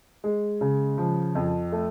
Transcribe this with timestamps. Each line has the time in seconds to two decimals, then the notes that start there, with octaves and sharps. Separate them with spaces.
0.24 G#3
0.61 C#3
0.98 F3
1.35 F2
1.72 A3